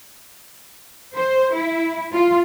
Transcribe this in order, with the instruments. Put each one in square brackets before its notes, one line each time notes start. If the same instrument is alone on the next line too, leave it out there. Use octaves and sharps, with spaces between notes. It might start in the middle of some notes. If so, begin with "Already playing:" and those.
[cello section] C5
E4
F4